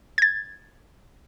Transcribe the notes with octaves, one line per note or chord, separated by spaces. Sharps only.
G#6 A6